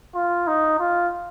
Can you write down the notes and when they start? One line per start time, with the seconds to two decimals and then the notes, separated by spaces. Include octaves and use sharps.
0.15 F4
0.47 D#4
0.79 F4